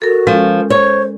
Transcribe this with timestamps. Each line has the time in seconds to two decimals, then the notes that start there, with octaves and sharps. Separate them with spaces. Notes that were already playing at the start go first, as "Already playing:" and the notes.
0.02 F#4 A4 A#4
0.27 F3 G#3 C#4 A4
0.70 C5 C#5